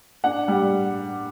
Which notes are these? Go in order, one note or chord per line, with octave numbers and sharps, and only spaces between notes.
D4 F#5
G3